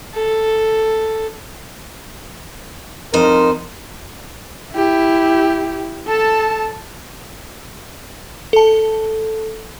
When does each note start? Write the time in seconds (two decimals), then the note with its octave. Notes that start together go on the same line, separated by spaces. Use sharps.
0.14 A4
3.14 F2 D#4 A#4 C5
4.73 E4 G4
6.08 A4 A5
8.53 A4 A5